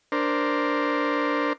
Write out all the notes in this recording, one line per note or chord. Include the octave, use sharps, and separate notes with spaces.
D4 A#4 C5